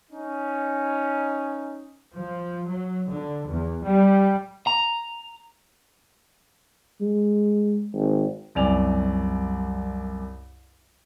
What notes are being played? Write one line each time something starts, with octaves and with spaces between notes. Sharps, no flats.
C#4 D#4
F3
F#3
D3
E2
G3
A#5
G#3
G#1
C2 F#2 C3 D5 G#5 F7